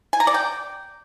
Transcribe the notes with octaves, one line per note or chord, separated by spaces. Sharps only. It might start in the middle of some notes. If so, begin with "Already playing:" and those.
G#5
A#5
D5
G5